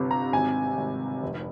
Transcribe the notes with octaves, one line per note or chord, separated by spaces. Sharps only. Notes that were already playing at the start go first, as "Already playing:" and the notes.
Already playing: G1 C3
A#5
G#1 G#5
G#1
F1